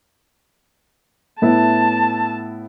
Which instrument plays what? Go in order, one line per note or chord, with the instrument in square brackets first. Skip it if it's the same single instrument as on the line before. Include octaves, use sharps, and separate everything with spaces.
[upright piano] A2 B3 E4 [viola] A5